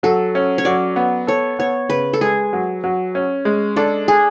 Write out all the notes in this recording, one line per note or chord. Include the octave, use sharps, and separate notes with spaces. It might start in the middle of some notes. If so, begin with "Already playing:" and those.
F#3 A4
C#4
C#5
F#3 D5
B3
A4 C#5
B3 C#5
C#3 B4
A4
G#3 G#4
F#3
F#3
C#4
G#3
D4 A4
G#4